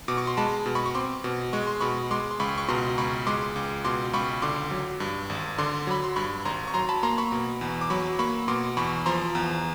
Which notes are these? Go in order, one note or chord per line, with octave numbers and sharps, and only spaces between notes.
B2 D6
C#6
C6
G#3 A5 B5
B2
B5 C#6
C#6
C4 C6 D6
B2
G#3 C#6
C6
B2 B5 C#6
G#3 C6 D6
C6
C#2 B5 C#6
C#6
B2 A#5 C6
C#2 B5 C#6
G#3 C6 D6
C#2
B2 C6 D6
C#2 B5 C#6
D3 C6 D6
F#3
G2
G#1
D3 C6 D6
F#3 B5
C6
G2 B5 C#6
G#1 A#5 C6
C#6
F#3 A#5 C6
A5 B5
A#3 A#5 C6
B5 C#6
B2
E2
D6
F#3 B5 C#6
A#3 B5 C#6
B2 C6 D6
E2 B5 C#6
F3 A#5 C6
E2